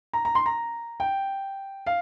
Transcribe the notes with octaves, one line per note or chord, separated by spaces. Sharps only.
A#5
A#5
C6
A#5
G5
F5